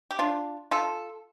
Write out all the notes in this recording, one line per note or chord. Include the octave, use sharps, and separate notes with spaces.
G4
D4 F4
F4 A4